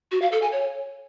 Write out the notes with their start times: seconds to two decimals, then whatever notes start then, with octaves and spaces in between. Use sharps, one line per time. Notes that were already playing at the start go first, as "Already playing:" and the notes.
0.11 F#4
0.22 F5
0.32 A4
0.42 G#5
0.52 C#5